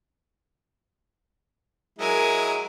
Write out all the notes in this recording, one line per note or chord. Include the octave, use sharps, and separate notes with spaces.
F#3 G#3 E4 A#4 G#5